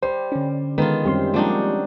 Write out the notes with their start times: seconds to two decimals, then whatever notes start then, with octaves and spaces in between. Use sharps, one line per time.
0.02 G3 C5
0.32 D3 C#4
0.78 D#3 G#3 B3 F4 A4 A#5
1.05 F#2 G3 C4 C#4 G4 C6
1.34 F3 F#3 G#3 A#3 D4 D#4